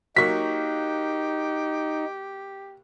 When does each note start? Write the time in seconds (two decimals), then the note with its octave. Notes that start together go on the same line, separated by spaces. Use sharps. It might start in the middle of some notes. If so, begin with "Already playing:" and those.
0.17 F#3 A#3 D#4 G4 C#6 B6